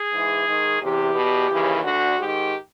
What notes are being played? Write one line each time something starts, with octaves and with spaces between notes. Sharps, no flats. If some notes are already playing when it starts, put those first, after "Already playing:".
Already playing: G#4
G#2 E3
G#2 D#3
E2 C3 E3 G4
E2 B2
D#2 C#3 E3
D2 D3 F#4
G#2 D#3 G4